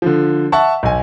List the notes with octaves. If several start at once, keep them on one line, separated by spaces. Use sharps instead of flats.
D3 F3
E5 F#5 A5 C#6
B1 G#5